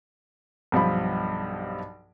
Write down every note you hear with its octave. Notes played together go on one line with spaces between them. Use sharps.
B1 G2 F3 B5